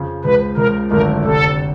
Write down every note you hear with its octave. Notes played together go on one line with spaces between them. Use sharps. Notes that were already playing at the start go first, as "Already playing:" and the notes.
Already playing: F2 C#3 F3
C#2 C#3 F3 B4
C#2 C#3 F3 A#4
G#1 F#2 D3 F3 A3 A#4
F1 F2 D3 G3 C4 A4